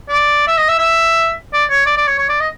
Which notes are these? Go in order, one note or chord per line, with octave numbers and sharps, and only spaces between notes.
D5
E5
D#5
E5
E5
D5
C#5
D5
D5
C#5
C#5
D5
D#5